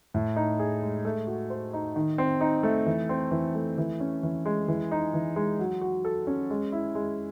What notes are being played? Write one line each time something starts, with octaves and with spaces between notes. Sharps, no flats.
A2
D#4
G#4
G#3
A3
F#4
C5
D#4
D#3
C4
D#4
A3
E3
C4
E3
A3
E3
C#4
E3
G#3
E3
D#4
E3
G#3
F#3
F#4
A4
C#4
G#3
E4
G#3